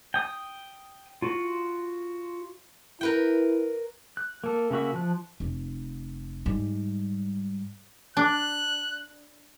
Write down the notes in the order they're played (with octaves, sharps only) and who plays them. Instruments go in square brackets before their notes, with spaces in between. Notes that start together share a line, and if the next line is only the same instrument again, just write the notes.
[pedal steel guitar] G5 D#6
F4 F#4
[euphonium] E4 [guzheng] A#4 B4 G5
[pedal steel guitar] F#6
A#3 A4
C#3 A#3 F#4 E5
F3 A5 F#6
[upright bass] F1
G#2 G3
[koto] D4 [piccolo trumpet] F#6